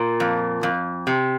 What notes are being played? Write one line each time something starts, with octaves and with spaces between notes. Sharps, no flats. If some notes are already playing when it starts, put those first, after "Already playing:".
Already playing: A#2
F2
F2
C3